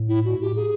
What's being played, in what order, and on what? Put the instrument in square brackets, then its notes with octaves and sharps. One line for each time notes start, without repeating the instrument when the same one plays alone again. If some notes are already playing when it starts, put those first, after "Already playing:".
Already playing: [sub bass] A2
[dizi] E4
F#4
G4
G#4